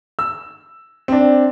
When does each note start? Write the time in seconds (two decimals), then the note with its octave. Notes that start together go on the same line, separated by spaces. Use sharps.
0.19 E6
1.08 C4 D4